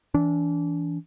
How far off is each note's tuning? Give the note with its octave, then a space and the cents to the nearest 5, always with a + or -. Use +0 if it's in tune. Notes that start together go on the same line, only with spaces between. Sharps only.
E3 +0 D4 -30